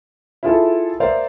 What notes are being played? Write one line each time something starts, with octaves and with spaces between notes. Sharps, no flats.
E4 F4 G#4 A4
A#4 C5 D5 E5 F5